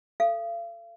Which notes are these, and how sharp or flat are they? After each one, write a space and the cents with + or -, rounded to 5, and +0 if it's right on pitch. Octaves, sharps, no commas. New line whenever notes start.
A4 +5 F5 -40